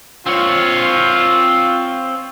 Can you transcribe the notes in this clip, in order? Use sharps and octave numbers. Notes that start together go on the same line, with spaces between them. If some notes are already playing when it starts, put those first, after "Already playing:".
C4 F4 C#5